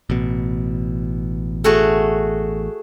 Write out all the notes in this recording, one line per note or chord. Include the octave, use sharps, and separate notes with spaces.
A1 B2
A3 F#4 G#4